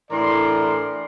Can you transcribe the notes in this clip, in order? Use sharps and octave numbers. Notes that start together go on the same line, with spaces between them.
A2 E3 D4 A#4 D5 C6